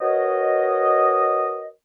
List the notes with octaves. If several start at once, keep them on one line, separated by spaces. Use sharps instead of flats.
F#4 A#4 B4 C#5 D#5